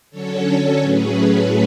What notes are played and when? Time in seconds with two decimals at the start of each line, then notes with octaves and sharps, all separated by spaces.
0.11 D3 F#3 C#4 A4 C#5
0.81 A2 F#3 A3 C#4 G#4 B4